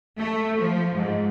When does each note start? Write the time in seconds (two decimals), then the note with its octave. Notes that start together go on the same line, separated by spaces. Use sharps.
0.18 A3
0.58 F3
0.95 G#2